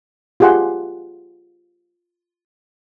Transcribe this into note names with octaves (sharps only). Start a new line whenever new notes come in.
F4 G4 G#4 F#5 C6